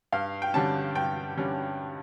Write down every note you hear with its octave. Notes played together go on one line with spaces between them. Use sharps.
G2 F5
G5
D3 G3 C#4 A5
G2 G5
D3 G3 C#4